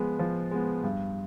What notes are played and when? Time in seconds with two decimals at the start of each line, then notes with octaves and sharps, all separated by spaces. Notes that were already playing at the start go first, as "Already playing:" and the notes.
Already playing: F3 G#3 B3
0.19 F3
0.51 G#3 B3
0.83 G2